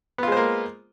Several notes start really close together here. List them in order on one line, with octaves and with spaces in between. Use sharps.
B3 F4 G#3 C5 A#3